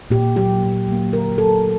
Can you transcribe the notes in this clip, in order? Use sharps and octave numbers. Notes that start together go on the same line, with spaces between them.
A#2 G4
F#3 A#3 G4
A#2
F#3 A#3
D3 A#4
F#3 A#3 A4